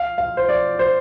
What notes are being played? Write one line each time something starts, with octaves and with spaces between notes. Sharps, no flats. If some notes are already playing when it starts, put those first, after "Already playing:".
Already playing: F5
F5
C5
D5
C5